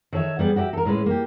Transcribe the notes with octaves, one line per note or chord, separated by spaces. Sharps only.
D#3 A4 C#5 E5
G3 B3 G#4
F#4 G4 D5 E5
A4 A#4
A2 G#3 C#4 B4
A#3 G4